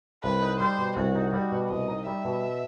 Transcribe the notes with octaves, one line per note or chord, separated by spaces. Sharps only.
C2 B4
D#4
G3 C5
B2
C2 F#4
D#4
G3 F#4
B2
C2 D#5
D#4
G3 E5
B2